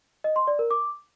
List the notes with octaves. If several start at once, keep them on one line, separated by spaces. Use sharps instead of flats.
D#5
C6
D5
A#4
D6